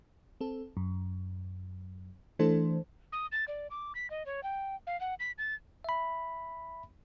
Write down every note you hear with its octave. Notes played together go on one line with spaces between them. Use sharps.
C4 A4
F#2
E3 A3 D4 A4 C5
D#6
A6
D5
D6
B6
D#5
C#5
G5
F5
F#5
B6
A6
E5 B5